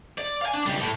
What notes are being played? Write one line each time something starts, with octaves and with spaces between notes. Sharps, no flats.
D5
F5 G#5
D4
C#2 G3
A2